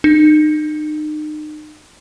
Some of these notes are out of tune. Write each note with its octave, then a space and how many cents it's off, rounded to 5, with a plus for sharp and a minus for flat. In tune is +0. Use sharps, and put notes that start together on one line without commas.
D#4 -35